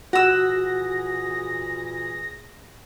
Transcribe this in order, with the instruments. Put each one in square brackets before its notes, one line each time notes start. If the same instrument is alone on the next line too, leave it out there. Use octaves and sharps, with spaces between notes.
[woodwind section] A#2 E3 G#4 [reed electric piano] F#4 [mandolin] F#5 E6 [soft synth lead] A#6